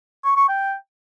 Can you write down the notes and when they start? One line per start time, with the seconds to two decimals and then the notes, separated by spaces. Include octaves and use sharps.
0.25 C#6
0.37 C#6
0.48 G5